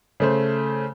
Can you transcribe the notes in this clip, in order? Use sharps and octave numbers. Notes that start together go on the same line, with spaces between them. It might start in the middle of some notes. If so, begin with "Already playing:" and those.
C#3 A3 C5